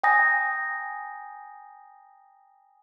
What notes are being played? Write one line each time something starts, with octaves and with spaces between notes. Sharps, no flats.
G5 G#5 A#5 D#6 A#6